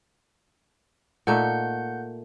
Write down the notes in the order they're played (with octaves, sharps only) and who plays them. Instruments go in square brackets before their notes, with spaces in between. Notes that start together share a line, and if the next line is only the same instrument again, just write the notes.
[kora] A#2 A3 D#4 [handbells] F#5 G6